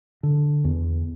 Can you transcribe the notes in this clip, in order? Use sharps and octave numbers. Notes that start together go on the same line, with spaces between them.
D3
E2